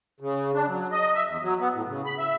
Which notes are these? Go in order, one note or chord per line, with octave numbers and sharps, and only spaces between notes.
C#3
D4
F#3
D#5
E5
E2
F#3
B3
A2
C#3
B5
E5